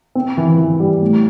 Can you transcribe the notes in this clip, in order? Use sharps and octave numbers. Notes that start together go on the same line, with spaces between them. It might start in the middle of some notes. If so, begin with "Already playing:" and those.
C4
E3
E3
G3
A2